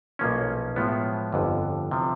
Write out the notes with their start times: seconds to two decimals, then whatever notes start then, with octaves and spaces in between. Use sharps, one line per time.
0.19 B1 A#2 F3 A#3 C#4
0.76 A2 F3 G#3 B3
1.33 G1 F2 D3
1.91 C3 F3